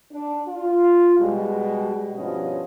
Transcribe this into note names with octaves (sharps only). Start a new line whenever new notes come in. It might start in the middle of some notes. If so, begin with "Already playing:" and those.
D4
F4
B2 G3 G#3
G2 B2 F3 C#4 D#5